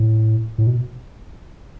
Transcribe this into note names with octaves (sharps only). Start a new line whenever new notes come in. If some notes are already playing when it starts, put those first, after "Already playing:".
Already playing: A2
A2
B2